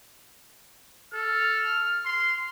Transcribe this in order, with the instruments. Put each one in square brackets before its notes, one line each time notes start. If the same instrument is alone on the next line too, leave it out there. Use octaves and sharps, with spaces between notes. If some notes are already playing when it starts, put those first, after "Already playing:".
[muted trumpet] A4 [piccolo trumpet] F6
[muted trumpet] C6